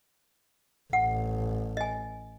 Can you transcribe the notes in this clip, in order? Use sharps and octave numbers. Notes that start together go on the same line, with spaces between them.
A1 F#5
D#5 G#5